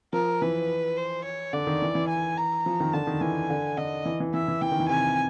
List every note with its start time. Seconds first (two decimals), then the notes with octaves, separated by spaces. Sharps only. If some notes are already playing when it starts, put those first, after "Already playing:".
0.13 F3 A#4
0.42 E3 B4
0.97 C5
1.25 C#5
1.53 D3 D5
1.67 D#3
1.82 E3
1.95 E3
2.09 G#5
2.38 A#5
2.66 F3
2.80 D#3
2.93 D3 A5
3.07 D#3
3.21 E3 G#5
3.50 D3
3.77 D3 D#5
4.05 E3
4.20 E3
4.34 E3 E5
4.48 E3
4.62 E3 G5
4.72 D#3
4.80 E3
4.89 C3 G#5